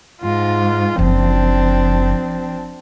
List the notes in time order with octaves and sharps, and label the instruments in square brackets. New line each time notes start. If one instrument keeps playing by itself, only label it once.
[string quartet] G#2 F4
[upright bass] F#1 [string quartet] F3 C4 D4